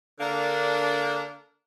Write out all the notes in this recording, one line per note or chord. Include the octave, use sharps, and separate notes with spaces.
D3 A#3 D4 A#4